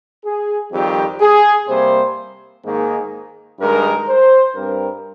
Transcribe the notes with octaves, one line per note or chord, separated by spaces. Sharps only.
G#4
F2 D#3 G3 C4 G4
G#4
C3 G3 A#3 C5
G#2 D#3 A#3 G#4
G2 D#3 G#3 A#4
C5
G2 G3 C4 A#4